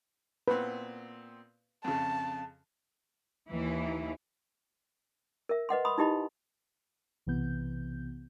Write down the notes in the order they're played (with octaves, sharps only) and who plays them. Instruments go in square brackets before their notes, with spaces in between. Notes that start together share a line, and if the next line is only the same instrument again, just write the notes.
[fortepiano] A#2 B3 C4 [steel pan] B4
[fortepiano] F2 C#3 [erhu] A5
[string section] D#2 E3
[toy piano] A#4 E5
B4 D#5 F#5 C6
B5 C6 D#6
D#4 E4 G4 D#5 B5
G4
[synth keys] B1 C3 E3 B3 G6